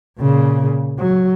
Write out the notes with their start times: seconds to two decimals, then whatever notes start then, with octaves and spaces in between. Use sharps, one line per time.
0.18 A#2 C#3
0.99 F#3